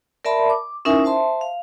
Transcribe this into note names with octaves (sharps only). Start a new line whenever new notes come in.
A#4 D5 E5 A5 B5 C6
D6
C#4 D#4 E4 A#4 E5 G#5
C5 E5 A5 C6
F5